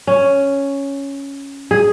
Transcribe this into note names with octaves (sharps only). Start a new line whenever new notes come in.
C#4
G#4